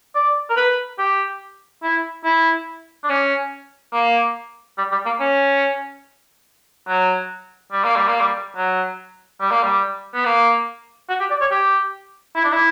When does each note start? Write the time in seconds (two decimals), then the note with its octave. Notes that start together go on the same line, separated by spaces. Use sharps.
0.15 D5
0.50 A#4
0.56 B4
0.98 G4
1.83 E4
2.25 E4
3.04 D4
3.09 C#4
3.93 A#3
4.78 G3
4.92 G3
5.06 A#3
5.20 C#4
6.88 F#3
7.72 G3
7.84 A#3
7.96 G3
8.08 A#3
8.21 G3
8.56 F#3
9.40 G3
9.51 A#3
9.63 G3
10.14 B3
10.25 A#3
11.09 F#4
11.20 G4
11.30 D5
11.41 C#5
11.51 G4
12.35 E4
12.44 D4
12.53 E4